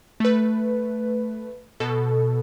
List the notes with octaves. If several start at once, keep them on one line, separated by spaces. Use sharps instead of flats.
A3 B4
B2 A4